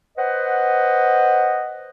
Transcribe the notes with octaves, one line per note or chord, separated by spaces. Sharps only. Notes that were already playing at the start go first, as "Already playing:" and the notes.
B4 C5 D#5 F#5